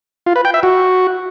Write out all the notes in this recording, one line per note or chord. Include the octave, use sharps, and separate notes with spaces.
F4
B4
G5
E5
F#4